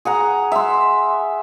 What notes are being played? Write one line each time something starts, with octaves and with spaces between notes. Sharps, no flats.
G#4 F#5 A#5
E5 C6